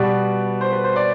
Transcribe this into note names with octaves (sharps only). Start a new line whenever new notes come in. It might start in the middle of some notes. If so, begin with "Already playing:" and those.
Already playing: B2 G3 B3 D5
C5
B4
C5
D5